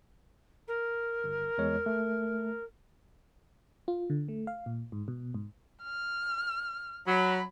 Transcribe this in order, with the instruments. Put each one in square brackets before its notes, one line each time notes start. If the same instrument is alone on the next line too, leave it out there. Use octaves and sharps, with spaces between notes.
[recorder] A#4
[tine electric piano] G1
E2 G#3 C#5
A3
[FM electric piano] F4
D3
A3
F5
A#2
G#2
B2
G#2
[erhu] F6
[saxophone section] F#3 [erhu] B5